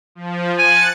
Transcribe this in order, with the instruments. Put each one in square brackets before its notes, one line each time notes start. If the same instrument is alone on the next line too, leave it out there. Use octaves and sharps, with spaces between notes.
[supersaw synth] F3
[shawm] G#5 [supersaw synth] F#6 A6 C#7